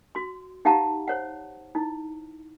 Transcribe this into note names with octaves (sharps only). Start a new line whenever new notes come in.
F#4 C6
D#4 G4 F5 F#5 A5 A#5
C5 C#5 F#5
D#4 E4